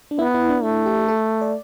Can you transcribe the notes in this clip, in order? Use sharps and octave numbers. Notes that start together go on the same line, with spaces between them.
D4
B3 E4
E4
D4
A3 E4
G4
A4
D5